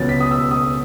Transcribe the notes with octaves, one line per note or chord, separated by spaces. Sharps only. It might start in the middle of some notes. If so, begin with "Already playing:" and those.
Already playing: C#2 B2 F#3 C#4 A6
B6
D#6
E6
D#6